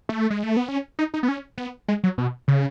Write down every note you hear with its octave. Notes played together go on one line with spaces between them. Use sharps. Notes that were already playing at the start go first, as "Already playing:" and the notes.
A3
G#3
A3
B3
C#4
D#4
D#4
B3
C#4
B3
G#3
F#3
B2
C#3